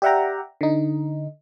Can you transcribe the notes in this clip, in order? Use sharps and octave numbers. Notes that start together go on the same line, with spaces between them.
G4 D5 E5 F#5 G5 A#5
D3 D#4